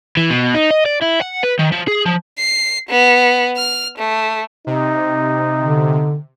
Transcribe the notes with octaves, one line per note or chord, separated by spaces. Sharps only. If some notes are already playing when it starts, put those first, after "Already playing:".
E3
B2
D#4
D#5
D5
E4
F#5
B4
D#3
F3
G#4
F3
C7
B3
F6
A3
C3 D#4
D3